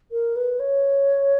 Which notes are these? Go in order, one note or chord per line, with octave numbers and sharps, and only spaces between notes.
A#4
B4
C#5